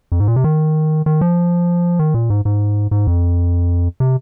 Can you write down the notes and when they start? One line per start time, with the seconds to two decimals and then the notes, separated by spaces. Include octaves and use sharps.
0.12 F2
0.20 G#2
0.28 A#2
0.36 C3
0.44 D#3
1.06 D#3
1.21 F3
1.99 D#3
2.14 A#2
2.30 G#2
2.45 G#2
2.91 G#2
3.07 F2
4.00 C3